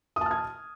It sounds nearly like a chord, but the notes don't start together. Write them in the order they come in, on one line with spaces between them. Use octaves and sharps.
D#6 A5 F6 G#6